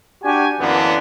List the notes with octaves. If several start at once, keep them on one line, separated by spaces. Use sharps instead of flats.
D4 F#4 G4 G#5
F#2 D3 E3 A#3 B3 D4